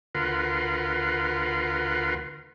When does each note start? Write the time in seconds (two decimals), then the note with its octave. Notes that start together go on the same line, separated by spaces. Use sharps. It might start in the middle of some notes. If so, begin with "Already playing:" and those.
0.15 D2 F4 A#4 B4 F#5 C6